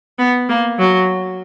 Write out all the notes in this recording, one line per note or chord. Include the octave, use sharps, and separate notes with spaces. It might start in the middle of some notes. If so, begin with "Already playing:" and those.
B3
A#3
F#3